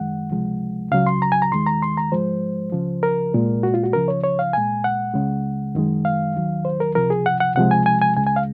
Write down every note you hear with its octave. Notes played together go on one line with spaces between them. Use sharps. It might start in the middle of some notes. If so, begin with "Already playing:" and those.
Already playing: F#2 D#3 G#3 F#5
C#2 C3 F3 G#3
C#2 C#3 F#3 F5
C6
A#5
G#5
A#5
D#2 D#3 G#3 C6
A#5
C6
A#5
G#2 F3 G#3 C5
C#2 C#3 F3
A#4
C2 A#2 G#3
F#4
F4
F#4
C#2 C#3 F3 A#4
C#5
C#5
F5
C2 A#2 G#3 G#5
F#5
C#2 C#3 G#3
F#2 D#3 G#3
F5
D#2 D#3 F#3
C5
A#4
C#2 C3 F3 A#4
G#4
F#5
F#5
C#2 C3 F3 G#3 F#5
G#5
G#5
G#5
C#2 C#3 G#3 G#5
G#5
F5